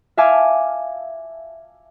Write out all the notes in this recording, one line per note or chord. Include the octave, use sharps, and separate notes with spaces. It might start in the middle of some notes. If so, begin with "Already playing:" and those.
E5 F5 G#5 A5 D6 F6